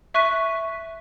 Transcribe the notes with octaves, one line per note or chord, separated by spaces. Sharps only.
E5 C#6 F#6 B6 D#7